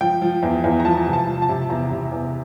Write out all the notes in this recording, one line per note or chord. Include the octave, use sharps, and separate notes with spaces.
F3 G5
F3
E2
E2
A#5
F3 A5
C3
A5
F3
A5
C3
E2 A#5
C3
E2